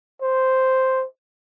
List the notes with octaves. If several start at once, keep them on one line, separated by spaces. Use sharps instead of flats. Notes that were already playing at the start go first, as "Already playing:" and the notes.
C5